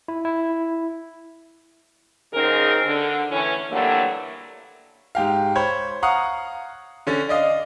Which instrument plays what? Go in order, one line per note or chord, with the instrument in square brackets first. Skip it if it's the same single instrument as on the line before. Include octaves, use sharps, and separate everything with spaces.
[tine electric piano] E4
E4
[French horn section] F#2 C#3 C4 D#4 G#4 A#4
D3
A2 E3 C#4
D3 E3 F#3 G3 A3 A#3
[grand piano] G#2 G4 F5
C5 C#5 B5 G#6
F5 F#5 A#5 C#6 D#6
D3 C#4 A6
D5 D#5 F5